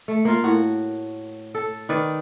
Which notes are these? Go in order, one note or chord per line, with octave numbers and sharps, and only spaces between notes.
A3
A#3 F4
A2 F#4
A4
D#3 B4 D5